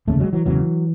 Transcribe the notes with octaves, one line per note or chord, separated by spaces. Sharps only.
F1 D#2 C#3 A3
F#3 G#3
E3 F#3
E1 E2 C#3 E3 F#3